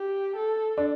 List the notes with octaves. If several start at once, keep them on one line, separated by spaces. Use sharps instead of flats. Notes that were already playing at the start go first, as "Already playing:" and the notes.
Already playing: G4
A4
D4